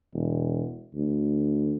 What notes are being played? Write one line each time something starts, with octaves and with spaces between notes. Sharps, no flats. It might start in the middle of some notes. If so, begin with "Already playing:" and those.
E1
D2